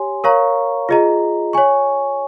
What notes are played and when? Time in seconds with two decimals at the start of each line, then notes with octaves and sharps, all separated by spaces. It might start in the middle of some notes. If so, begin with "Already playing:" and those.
Already playing: G4 C#5 G#5 C6
0.24 A#4 C#5 F5 A#5 C#6
0.89 F4 G#4 D#5 A#5
1.53 C#5 G#5 C#6